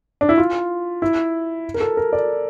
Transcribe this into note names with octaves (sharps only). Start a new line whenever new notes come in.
D4
E4
F4
E4
A#4
A4
A#4
D5